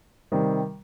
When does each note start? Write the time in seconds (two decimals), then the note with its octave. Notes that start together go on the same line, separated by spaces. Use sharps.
0.32 C3 D#3 G3